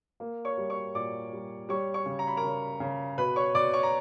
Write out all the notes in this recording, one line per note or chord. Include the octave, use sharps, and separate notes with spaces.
A#3
C#5 C#6
G3
C#5 C#6
A#2 D5 D6
G3
G3 C#5 C#6
C#5 C#6
C#3
A#5
B5
A#4 A#5
C#3
C#3
B2 B4 B5
C#5 C#6
B2 D5 D6
C#5 C#6
A#5